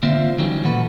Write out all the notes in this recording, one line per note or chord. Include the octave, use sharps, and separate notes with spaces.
D3 A#3 C4 F4 C5 E5
D#3 E3 F#3 G3 A3 C#4
A#2 F3 F#4 A4 B4